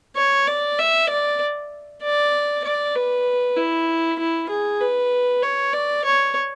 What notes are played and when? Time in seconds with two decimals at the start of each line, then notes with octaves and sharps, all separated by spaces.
0.16 C#5
0.48 D5
0.78 E5
1.09 D5
2.02 D5
2.64 D5
2.96 B4
3.57 E4
4.19 E4
4.49 G#4
4.81 B4
5.42 C#5
5.73 D5
6.04 C#5